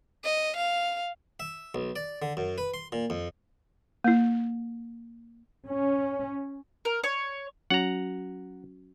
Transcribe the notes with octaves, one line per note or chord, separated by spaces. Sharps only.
D#5
F5
E5
B1
D5
D3
F#2
B4
C6
A#2
F2
A#3 E4
C#4
A#4
C#5
F#3 C#4 F#4 F#5 A#5